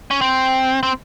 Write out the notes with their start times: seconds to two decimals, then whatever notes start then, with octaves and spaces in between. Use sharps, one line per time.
0.11 C#4
0.21 C4
0.83 C4